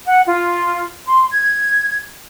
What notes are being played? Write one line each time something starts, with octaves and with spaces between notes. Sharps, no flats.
F#5
F4
C6
G#6